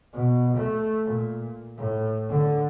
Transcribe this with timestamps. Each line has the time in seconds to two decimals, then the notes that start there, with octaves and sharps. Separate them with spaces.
0.13 B2
0.57 A3
1.05 A#2
1.77 A2
2.29 D3